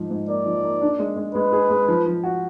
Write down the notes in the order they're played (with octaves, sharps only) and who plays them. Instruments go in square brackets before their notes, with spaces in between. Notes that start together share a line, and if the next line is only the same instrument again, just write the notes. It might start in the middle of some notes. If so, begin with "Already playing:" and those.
Already playing: [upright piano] G#2 F3
G#2
[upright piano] A#3 [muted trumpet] D5
[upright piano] F3
A#3
D4
G#3
G#3
[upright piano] G#3 [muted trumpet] B4
[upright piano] G#4
G#3
F3
F3
F#4